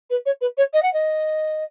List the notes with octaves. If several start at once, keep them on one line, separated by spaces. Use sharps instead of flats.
B4
C#5
B4
C#5
D#5
F#5
D#5